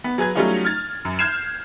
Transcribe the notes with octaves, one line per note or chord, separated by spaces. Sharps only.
B3
F#3 G#4 B4 G#6
F#3 G3 A3 C#4 D#4 F4
F6 G#6 A6
F#2
F6 G6 G#6 C7 E7